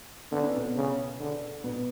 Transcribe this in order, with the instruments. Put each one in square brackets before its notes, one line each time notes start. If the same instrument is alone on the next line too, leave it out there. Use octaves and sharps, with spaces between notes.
[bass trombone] D3 [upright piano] B3
[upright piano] C#4
B2 B3
[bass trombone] C#3
D3
[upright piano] B2 B3